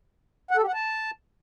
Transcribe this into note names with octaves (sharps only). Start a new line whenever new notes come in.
F#5
A4
G4
F#5
A5